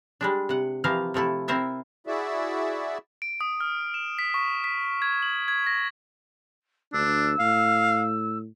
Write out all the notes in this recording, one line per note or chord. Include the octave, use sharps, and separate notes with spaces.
G3 G#3 D4
C3 F#5
C3 E3 F3 A#4 F5
C3 F3 A3 E4
C4 E4 A#4 C5 E5 A5
E4 F#4 G#4 D5 E5
D7
D#6
F6
E7
B6
C#6
B6
G#6
F#7
G#6
A#6
D2 D4 E6
A2 F5